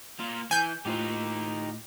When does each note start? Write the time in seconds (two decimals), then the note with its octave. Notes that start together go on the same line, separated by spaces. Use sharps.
0.19 A#3 F4
0.51 E3 G#5 G6
0.85 A2 D#4 F4 G4 C5